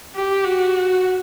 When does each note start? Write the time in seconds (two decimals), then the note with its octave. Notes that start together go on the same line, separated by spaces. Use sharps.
0.16 G4
0.44 F#4